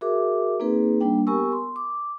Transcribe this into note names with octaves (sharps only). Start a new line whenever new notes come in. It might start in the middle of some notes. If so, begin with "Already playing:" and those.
F#4 G#4 A#4 E5 D6
A#3 C4 D#4 G#4 B4
G3 A#3 D4 G5
B3 G4 A#4 G#5 C#6 E6
C6
D6